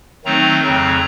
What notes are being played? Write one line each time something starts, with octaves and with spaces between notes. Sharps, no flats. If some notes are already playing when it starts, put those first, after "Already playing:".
D#3 F#3 A3 C4 D#4 A#5
F2 C#3 F#3 C4